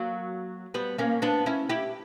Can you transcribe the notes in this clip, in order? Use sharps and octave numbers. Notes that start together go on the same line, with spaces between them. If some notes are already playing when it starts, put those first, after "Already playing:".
Already playing: F#3 A#3
G3 B3
A#3 C#4
B3 D4
C#4 E4
E4 G4